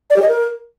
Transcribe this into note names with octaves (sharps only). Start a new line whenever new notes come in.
D5
G4
D#5
A#4